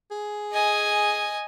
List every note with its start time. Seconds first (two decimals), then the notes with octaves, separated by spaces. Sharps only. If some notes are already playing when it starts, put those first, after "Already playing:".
0.11 G#4
0.52 D#5 G#5